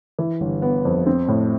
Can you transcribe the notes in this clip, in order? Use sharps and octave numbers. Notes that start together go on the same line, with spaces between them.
E3
G1
B3
F2
C4
A2